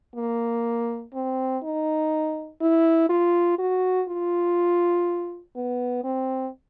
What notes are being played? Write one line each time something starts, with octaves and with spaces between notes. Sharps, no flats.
A#3
C4
D#4
E4
F4
F#4
F4
B3
C4